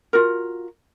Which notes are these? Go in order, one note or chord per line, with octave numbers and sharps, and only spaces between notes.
F4 F#4 A#4